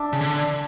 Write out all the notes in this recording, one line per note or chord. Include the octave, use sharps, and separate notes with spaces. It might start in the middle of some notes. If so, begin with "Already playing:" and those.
Already playing: D4 D5 E5
C#3
D3